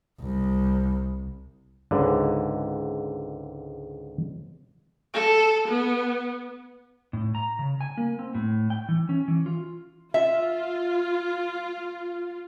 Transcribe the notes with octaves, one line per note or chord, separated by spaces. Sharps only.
C2
C#2 G#2 D3
A4
B3
A2
A#5
C#3
G#5
A#3
C4
A2
G5
E3
C#4
E3
F4
F4 E5